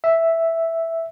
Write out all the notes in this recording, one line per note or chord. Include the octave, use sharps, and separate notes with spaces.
E5